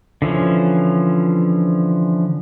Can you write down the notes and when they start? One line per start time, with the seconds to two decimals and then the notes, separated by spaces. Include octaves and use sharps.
0.22 D3 E3 F3 C#4